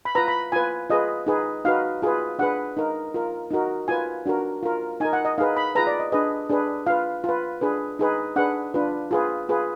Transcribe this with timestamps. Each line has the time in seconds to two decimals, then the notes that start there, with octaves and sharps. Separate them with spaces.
0.05 B5
0.15 F4 B4 A#5
0.28 B5
0.52 F4 B4 G#5
0.90 F4 G#4 B4 D#5
1.26 D#4 G#4 B4
1.65 D#4 F#4 B4 F5
2.02 F4 G#4 B4
2.39 D4 G#4 B4 F#5
2.77 D#4 A#4
3.14 F4 A#4
3.50 D#4 F#4 A#4
3.88 F4 B4 G#5
4.26 D4 F#4 A#4
4.63 F4 A#4
5.00 D#4 A#4 G#5
5.13 F#5
5.25 D#5
5.38 D#4 G#4 B4 F5
5.57 B5
5.75 F4 G#4 B4 A#5
5.87 D5
6.00 D#5
6.12 D4 G#4 B4 D#5
6.49 D4 G#4 B4
6.87 F4 B4 F5
7.24 F4 B4
7.61 D4 G#4 B4
7.99 D#4 G#4 B4
8.36 D4 G#4 B4 F#5
8.74 D4 F4 B4
9.11 F4 G#4 B4
9.49 F4 G#4 B4